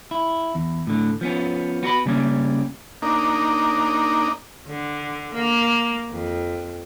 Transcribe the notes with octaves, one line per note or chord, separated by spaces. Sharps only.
E4
E2
A2 D3
F3 B3 C#4
B3 F#4 C#5 B5
C#3 G3 A#3 C#4
A#3 D4 D#4
D3
A#3
F2